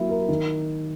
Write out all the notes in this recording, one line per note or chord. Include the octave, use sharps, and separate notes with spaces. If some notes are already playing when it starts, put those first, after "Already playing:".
Already playing: F#3 A#3 E4
A#4
D#3